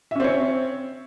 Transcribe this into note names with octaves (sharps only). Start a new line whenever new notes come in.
C4 C#4 C#5 E5